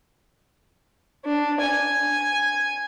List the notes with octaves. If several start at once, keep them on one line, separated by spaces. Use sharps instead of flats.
D4
G#5